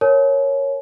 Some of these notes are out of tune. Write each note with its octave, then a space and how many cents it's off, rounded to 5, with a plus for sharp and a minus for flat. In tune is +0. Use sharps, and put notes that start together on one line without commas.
A#4 +0 C#5 -5 A5 -45